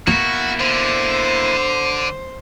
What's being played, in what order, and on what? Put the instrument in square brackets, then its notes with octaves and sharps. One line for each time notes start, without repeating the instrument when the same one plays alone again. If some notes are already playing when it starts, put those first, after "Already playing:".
[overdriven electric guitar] A#3 E4 [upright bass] B3 [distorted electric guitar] F#4
[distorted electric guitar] D3 [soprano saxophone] C5